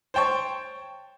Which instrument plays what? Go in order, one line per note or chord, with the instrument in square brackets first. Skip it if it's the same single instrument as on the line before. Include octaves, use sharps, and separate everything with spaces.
[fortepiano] C5 C#5 G5 A5 C#6